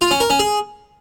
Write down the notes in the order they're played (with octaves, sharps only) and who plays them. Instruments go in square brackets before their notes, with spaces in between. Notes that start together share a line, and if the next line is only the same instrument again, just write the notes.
[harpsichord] F4
C#4
A#4
C#4
G#4